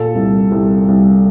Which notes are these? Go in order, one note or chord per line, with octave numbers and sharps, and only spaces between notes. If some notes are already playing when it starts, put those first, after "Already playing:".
Already playing: A#2 A4
C2
C2
C2